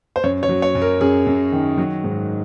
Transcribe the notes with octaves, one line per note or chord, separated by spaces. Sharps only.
C5
F#2 C#5
C#5
F#3
C#5
F#2
A#4
F#2 G#4
F#2
D#3
F#3 F#4
G#2